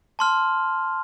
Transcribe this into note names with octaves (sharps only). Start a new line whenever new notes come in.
A5 C6 F6